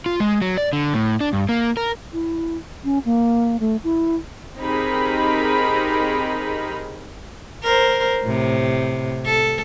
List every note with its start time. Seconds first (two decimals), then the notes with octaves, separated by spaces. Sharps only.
0.06 F4
0.20 G#3
0.42 F#3
0.58 D5
0.73 D3
0.94 A2
1.21 D4
1.33 G2
1.49 A#3
1.77 A#4
2.13 E4
2.84 C#4
3.05 A#3
3.60 A3
3.84 E4
4.58 C4 D#4 G4 G#4 A#4 B5
7.64 A#4 C5
8.23 A2 C3
9.25 A4